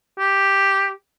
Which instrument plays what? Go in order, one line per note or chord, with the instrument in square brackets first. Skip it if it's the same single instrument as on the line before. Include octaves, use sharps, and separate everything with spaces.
[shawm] G4